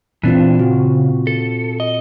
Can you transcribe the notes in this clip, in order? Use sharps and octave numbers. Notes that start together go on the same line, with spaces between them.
A#2 E3 C4 D4 F4
C#3 F#4
A4
D#5